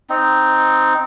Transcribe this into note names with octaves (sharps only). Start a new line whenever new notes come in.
C4 D#4